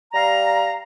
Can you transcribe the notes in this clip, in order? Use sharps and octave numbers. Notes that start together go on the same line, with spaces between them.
G3 F5 A#5